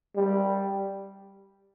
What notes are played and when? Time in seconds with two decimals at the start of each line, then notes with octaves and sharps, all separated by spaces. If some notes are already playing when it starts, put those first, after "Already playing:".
0.16 G3